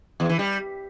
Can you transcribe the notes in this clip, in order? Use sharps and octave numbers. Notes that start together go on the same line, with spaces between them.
E2
E3
G3